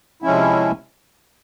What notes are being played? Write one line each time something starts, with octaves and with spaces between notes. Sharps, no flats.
C3 F3 G#3 C#4 E4